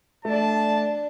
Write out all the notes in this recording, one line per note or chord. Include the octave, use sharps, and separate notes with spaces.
A3 D4 D5 A5